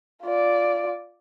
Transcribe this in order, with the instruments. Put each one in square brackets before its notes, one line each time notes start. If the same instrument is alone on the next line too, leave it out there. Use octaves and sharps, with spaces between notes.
[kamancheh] F4 D5